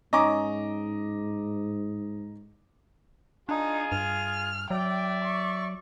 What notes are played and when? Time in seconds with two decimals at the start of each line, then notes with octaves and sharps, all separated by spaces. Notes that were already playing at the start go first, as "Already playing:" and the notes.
0.13 G#2 C#4 D#4 D#5 A#5 D6
3.49 D4 D#4 F4 G#4
3.92 G2 F6
4.70 F#3 D5 E5 G5
5.25 C#6